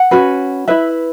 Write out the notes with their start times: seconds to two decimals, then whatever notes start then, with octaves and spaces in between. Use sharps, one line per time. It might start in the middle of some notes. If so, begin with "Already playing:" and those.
Already playing: F#5
0.11 C#4 F#4 B4
0.68 E4 B4 E5